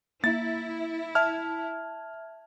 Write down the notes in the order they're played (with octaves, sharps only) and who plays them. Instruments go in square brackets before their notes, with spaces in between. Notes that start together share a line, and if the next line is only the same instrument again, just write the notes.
[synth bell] A#3 [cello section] E4 [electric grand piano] A6
[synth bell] E5 A5 G#6 [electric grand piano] F6